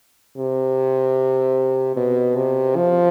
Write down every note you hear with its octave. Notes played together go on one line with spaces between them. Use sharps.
C3
B2
C3
F3